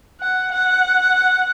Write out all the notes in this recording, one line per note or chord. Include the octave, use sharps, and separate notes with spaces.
F#5
F#5